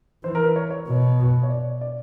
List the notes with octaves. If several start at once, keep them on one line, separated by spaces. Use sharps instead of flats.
E3 C5
A#4
B4
C#5
C#5
B2
C#5
D5
D5